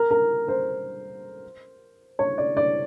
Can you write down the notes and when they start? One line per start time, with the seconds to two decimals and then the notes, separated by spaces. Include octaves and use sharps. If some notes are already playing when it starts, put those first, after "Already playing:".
Already playing: A#4
0.11 A#4
0.48 C5
2.19 C#5
2.38 D5
2.57 D5